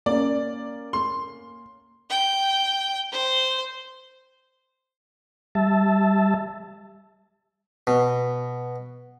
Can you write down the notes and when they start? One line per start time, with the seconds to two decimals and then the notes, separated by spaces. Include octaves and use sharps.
0.06 A#3 C#4 D5
0.93 C6
2.10 G5
3.12 C5
5.55 G3 E5 A5
7.87 B2